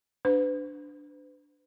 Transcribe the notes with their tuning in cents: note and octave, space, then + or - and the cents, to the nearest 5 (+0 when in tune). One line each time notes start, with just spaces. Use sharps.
D4 +0 B4 +40